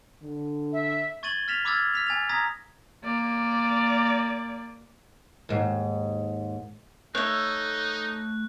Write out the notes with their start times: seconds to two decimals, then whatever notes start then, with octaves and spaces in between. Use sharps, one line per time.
0.23 D3
0.72 E5
1.23 C#6 G#6 A6 D#7 F#7 G7
1.48 F6 A6 B6 E7 F7
1.65 B5 D6 E6 F6 G#6 A6
1.94 F6 B6 F7
2.07 G#5 A6 F7
2.29 A#5 D#6 G#6 A#6 B6
3.04 A#3 D5
5.49 D#2 G#2
7.15 A3 D#4 C#5 E5 F#6